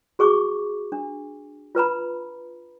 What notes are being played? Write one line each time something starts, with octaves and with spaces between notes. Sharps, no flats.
F#4 G#4 C#6 D6
D4
F4 B4 A#5 B5